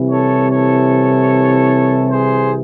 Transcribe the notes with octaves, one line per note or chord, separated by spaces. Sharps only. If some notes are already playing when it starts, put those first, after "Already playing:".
Already playing: C2 C3 E3
A4 C#5
A4 C#5
G#4 C5